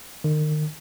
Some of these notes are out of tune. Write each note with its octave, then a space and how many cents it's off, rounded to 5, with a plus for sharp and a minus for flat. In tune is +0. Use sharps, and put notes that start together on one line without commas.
D#3 -35